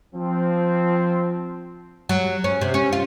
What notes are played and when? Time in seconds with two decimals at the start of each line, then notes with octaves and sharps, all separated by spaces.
0.14 F3 C4
2.09 F#3
2.44 C#4
2.61 C3
2.74 C#4
2.93 F4